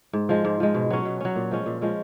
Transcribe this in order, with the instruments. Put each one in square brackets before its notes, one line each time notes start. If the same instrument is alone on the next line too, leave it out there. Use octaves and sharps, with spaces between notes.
[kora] G#2
F3 G#3
G#2
F3 G#3
B2
F#3 C#4
B2
F#3 C#4
A#2
F3 G#3 C#4
A#2
F3 G#3 C#4